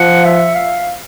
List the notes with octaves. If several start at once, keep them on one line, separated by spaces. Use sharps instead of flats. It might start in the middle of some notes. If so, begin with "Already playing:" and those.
Already playing: F3 F#5
E5
F5